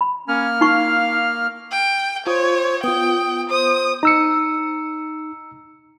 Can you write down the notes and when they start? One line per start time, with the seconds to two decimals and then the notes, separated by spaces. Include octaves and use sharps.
0.01 B5
0.28 A#3 C#4 F6
0.61 D#4 F5 C#6
1.72 G5
2.27 F4 C5 C#5 D#6
2.84 B3 F4 G5 D#6
3.50 C5 D#6
4.03 D#4 A#5 E6 C#7